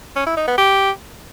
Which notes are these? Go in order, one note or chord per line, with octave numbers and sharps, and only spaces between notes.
C#4
E4
D#4
B3
G4